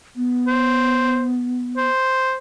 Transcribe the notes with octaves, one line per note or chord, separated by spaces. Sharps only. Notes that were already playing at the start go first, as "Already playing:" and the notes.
B3
C5
C5